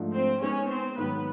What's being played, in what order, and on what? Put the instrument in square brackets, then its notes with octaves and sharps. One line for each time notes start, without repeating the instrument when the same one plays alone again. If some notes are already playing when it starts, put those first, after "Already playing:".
Already playing: [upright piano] G#2 F3 A3 D4
[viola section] C4 C5
[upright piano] G#3 B3 D#4 [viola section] C#4 C#5
[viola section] C4 C5
[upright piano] G#2 D#3 F#3 [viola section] B3 B4